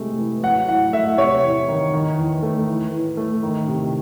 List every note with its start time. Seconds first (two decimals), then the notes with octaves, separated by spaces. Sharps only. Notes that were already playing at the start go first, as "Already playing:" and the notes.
Already playing: C3 G#3 A3
0.18 E3
0.43 F#3 F#5
0.68 A2 F#5
0.93 A3 E5
1.18 C3 C#5
1.43 E2
1.68 D#3
1.93 D#3
2.18 E2
2.42 A3
2.67 E3
2.92 A2
3.17 A3
3.43 D#3
3.68 C3